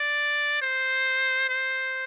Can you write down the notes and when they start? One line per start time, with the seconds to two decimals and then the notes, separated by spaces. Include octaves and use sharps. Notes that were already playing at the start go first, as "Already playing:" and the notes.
Already playing: D5
0.62 C5
1.49 C5